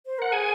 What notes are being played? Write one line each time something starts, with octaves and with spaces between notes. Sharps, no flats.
C5
A#4 F#5
G#4 G#5